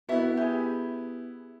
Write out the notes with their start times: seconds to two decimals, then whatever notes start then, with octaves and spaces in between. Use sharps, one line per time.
0.09 B3 E4 F#4 E5
0.37 G4 G#4